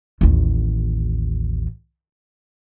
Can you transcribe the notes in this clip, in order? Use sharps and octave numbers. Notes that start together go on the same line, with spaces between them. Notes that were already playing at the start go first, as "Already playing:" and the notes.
A1 D#2